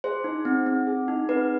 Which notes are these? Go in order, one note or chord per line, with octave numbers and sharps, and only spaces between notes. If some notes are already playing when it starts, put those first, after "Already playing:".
G#4 C5
D#4
C4
C4
G#4
D#4
C4 B4